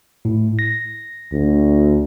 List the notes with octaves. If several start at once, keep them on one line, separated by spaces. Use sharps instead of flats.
A2
A#6
D2